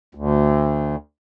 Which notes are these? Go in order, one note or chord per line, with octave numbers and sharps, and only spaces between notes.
D2